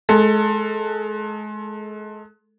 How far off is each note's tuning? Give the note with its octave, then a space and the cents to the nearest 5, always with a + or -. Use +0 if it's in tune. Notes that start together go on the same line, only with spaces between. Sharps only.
G#3 +35 A4 +15